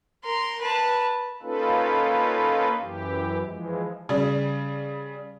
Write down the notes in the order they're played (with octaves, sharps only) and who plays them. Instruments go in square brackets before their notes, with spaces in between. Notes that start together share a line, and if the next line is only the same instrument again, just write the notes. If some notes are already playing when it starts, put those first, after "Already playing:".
[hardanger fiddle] A#4 C6
B4 A5
[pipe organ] A#3 C#4 D#4 F4 A4 B4
F#2 E3 G4
E3 F3 G#3
[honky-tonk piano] C#3 G3